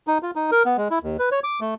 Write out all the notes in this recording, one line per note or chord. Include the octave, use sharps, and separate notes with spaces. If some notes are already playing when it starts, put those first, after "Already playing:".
D#4
F4
D#4
A#4
B3
G#3
E4
D#2
B4
C#5
D6
A3